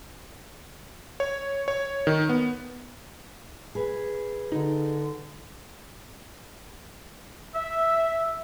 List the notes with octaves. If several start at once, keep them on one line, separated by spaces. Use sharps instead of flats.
C#5
C#5
D#3
B3
G#4 B4
D3 D#4
E5